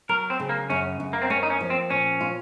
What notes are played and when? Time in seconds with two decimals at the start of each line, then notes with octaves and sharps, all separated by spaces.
0.09 F#3 A#4
0.30 C4
0.40 C#3
0.49 A#3
0.70 F#2 C#4
1.00 F#2
1.13 A#3
1.22 C4
1.30 A#3 C#4
1.43 D#4
1.50 C#4
1.61 F3
1.70 C4
1.90 A#2 C#4
2.21 F4